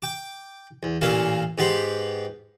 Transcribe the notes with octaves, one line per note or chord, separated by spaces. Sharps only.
G5 D6
E2
A1 A#2 A#3 C#4 E4 F5
G#2 B3 G4 B5 C6